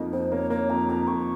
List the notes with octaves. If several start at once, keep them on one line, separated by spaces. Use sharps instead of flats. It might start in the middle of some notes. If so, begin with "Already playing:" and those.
Already playing: F2 A#3 D#4
F2 C5
A#3 C#5
A#3 C#5
F2 A#5
F2 A#5
F2 C#6